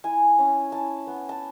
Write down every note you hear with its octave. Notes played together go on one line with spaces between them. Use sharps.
E4 G#5
C#4
E4 A5
B3
A5